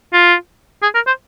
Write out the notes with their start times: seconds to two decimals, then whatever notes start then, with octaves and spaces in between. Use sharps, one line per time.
0.13 F4
0.83 G#4
0.95 A#4
1.07 C5